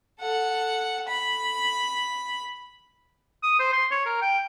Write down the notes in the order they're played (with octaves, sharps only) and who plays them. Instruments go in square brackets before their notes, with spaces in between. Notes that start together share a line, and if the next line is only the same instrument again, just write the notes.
[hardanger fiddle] A4 F#5
B5
[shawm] D#6
C5
C6
C#5
A#4
G5